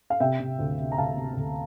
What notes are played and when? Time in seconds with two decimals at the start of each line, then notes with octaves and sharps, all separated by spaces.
0.10 F5
0.20 C3 E5 G5
0.40 C3
0.59 D2
0.78 C3
0.92 A#5
0.98 D2 F5 A5
1.17 C3
1.37 D2